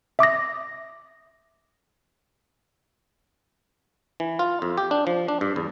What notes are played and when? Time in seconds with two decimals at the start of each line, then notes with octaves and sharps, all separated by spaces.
0.19 E5 D6 D#6 A#6
4.20 E3
4.39 F4
4.62 F2
4.78 G4
4.91 D4
5.07 F3
5.28 D4
5.41 G2
5.56 E2